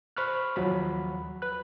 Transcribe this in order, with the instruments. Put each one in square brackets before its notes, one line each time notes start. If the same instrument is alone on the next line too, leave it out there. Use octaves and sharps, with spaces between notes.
[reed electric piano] C5 B5 C#6 F6 F#6
D#2 F3 F#3 B5
B4 F#6